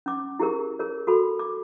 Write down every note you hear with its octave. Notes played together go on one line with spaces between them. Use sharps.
C#4 D6
E4 G4 G#4 A#4
G#4 A#4 C#5
F#4 A4 B5
D6